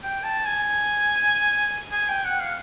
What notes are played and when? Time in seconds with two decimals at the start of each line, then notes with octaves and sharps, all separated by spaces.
0.04 G5
0.24 A5
0.46 G#5
1.92 G#5
2.09 G5
2.25 F#5
2.39 F5